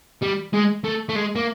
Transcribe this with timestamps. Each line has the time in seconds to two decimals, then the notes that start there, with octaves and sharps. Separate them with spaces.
0.22 G3
0.53 G#3
0.84 A3
1.09 A3
1.15 G#3
1.35 A#3